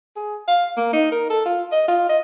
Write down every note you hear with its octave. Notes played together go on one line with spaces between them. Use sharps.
G#4
F5
A#3
D#4
A#4
A4
F4
D#5
F4
D#5